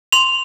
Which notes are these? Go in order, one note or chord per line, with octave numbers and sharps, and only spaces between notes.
C6 F7